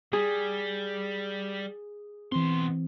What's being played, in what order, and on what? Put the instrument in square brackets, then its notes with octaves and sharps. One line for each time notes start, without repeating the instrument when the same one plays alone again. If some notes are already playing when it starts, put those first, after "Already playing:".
[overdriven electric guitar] G3 [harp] G#4
[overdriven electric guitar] B2 C6 [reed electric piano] E3 C4